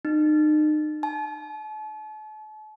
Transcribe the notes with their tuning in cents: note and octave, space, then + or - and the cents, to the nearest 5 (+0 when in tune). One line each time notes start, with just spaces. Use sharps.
D#4 -35
A5 -40